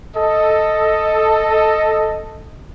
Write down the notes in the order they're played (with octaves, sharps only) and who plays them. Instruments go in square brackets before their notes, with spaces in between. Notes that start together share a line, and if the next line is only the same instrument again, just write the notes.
[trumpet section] A4 D#5